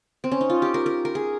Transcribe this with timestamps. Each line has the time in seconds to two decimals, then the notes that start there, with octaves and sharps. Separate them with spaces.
0.24 C4
0.32 C#4
0.41 D#4
0.50 F4
0.62 G4
0.74 A#4
0.86 A#4
1.05 A#4
1.15 G#4